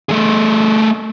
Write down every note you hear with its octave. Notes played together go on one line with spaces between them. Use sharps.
A3 G#4